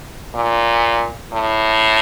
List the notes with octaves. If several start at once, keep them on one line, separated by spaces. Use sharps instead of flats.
A#2
A2